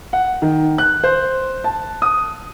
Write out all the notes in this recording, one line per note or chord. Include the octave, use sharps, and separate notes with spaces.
F#5
D#3
F#6
C5
A5
D#6